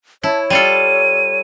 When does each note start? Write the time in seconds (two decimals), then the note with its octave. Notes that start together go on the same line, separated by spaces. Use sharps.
0.23 E4 C#5 A5
0.50 G3 F4 A4 D#7